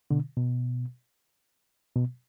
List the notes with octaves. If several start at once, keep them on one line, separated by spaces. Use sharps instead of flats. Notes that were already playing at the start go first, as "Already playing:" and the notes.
B2 D3
B2
B2